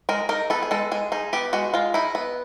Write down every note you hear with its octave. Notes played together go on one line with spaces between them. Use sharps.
G#3 A#4
D#4 A#4
B3 A4
G#4
G#3 A4
G#3 G#4
D#4 G#4
B3 G4
G#3 F#4
G#3 F4
D#4 E4
B3